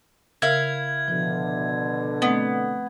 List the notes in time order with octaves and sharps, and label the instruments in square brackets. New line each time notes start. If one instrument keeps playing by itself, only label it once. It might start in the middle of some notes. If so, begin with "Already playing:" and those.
[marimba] C#3 A#4 [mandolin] E4 F5 [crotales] G#6
[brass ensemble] B2 D3 [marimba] F3
[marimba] A3 C4 D#5 [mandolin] B3